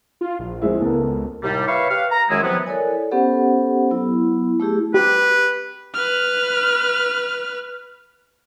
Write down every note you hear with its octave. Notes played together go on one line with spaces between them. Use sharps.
F4
A#1
F2 G#3 E4
C#2 B3 A4 A#4
D#2 A2 C3 G3
B4 C#5 E5 F5 C#6
G4 B4 F5
A#5
F#2 D#3 G#3 E4 G#4
C3 F3 F#3 B3
E4 A4 A#4 C#5 D5 G#5
B3 C#4 G4 A4 C5 F#5
F#3 B3 E4
A3 E4 G4 G#4
G4 B4
B4 F6